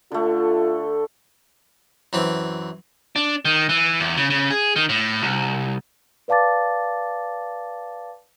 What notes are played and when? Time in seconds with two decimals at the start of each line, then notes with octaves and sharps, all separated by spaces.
0.12 D3 A3 F4
2.13 F#2 E3 C4
3.16 D4
3.45 D#3
3.69 E3
4.00 E2
4.17 C#3
4.30 C#3
4.50 G#4
4.76 D#3
4.89 A2
5.22 C2
6.28 B4 D5 F5 A5 D6 A6